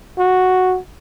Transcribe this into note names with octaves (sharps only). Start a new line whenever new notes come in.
F#4